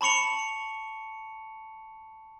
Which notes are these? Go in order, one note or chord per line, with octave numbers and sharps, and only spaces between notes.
A5 B5 C#6 C#7 F7